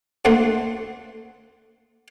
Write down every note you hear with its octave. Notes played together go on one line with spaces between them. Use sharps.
D2 A3 A#3 F#5 C6